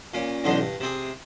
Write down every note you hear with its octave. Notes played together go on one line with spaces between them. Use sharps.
A#2 C#4
B1 E2 D3 C#4 D#4 C6
G2
C3 C4 G#4